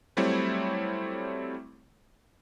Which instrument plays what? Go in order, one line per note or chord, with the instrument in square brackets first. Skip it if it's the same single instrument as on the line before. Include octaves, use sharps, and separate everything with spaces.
[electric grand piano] F#3 G3 A3 C4 E4 C#5